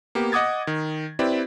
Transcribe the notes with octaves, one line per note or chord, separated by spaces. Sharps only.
A#3 B3 G4
D#5 F#5 D6 D#6 G#6 A6
D#3
C4 E4 G4 B4 D5